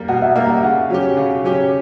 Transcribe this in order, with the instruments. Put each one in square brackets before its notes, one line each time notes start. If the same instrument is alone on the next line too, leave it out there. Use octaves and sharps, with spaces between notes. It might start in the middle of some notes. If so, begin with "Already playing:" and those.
Already playing: [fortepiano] G3 A#3
[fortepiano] B2 [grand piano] F#5
[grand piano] E5
[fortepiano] G3 A#3 [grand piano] E5
[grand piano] F#5
[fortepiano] C#3
F#3 C#4 G4
C#3
F#3 C#4 G4